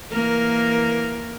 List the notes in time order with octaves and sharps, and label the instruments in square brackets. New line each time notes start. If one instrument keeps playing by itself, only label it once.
[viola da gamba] E3 A#3 A#4